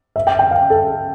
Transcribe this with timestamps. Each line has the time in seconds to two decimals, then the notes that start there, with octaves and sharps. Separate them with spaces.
0.16 E5
0.27 G5
0.39 G5
0.51 F5
0.70 A4